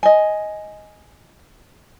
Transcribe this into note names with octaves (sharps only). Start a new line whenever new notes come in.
D#5 G#5